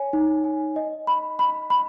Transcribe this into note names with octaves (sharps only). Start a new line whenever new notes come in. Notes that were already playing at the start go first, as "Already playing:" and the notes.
Already playing: C#5 G#5
D#4
G#5
D#5
B5
B5
B5